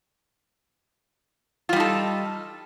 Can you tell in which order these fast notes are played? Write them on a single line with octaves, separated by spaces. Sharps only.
F4 G3 D#4 A4